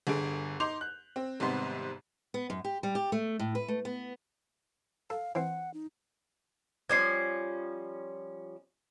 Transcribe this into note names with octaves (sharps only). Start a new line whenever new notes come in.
G1 D3 G#4 D7
D#4 C6 D6 G6 F7
F#6
C4
G#1 G#2 C3 G3 B3 C6
B3
F#2
G4
G3
G4
A3
A2
B4
A3
B3
A4 F5
E3 C4 F#5
D#4
F3 G3 C#4 G#6 C7